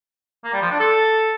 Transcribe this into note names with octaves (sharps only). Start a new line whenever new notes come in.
A#3
G3
F3
D4
A4